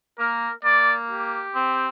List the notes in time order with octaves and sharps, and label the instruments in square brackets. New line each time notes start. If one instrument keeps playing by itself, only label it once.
[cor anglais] A#3 [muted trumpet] A#4
[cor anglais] A#3 [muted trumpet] D5
[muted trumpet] G4
[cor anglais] C4